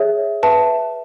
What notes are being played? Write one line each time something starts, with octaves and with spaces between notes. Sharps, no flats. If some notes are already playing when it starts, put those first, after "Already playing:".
Already playing: G#4 C#5 E5
B4 E5 A5